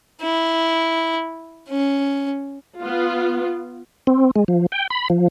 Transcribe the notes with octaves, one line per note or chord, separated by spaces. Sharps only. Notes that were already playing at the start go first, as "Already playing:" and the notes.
E4
C#4
B3 F4
C4
G#3
F3
G5
B5
F3